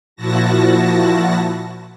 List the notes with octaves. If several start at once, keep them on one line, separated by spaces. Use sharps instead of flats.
A#2 F3 E4 F#4 A5 A#6